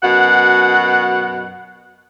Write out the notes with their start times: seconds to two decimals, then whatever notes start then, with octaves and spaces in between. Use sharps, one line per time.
0.03 F#2 B2 F#5